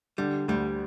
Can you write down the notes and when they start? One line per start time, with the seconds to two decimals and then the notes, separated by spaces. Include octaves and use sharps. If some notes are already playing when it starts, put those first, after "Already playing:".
0.18 D3 G3
0.48 D2 G3